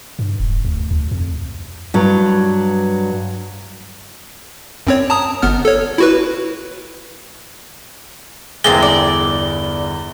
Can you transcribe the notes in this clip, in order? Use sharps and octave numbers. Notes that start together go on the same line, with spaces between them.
G2
D#1
D2
D2
F2
G2 F#3
F#2 C4 C#5
A5 A#5 D#6
G1 B3 F6
A4 C#5
E4 F#4 B4
G1 E2 G#3 A#3 C4 A6 G7
D5